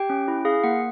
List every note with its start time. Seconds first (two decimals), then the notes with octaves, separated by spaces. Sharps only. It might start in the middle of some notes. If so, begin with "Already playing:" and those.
Already playing: G4 G5
0.10 C#4
0.28 E4
0.45 G#4 F5
0.64 A#3 F#5